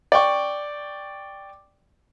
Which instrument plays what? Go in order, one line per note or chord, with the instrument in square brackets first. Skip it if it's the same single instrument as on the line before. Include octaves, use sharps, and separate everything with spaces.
[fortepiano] D5 G5 C#6